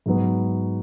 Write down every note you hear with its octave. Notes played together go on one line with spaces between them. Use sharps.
G#2 F#3 B3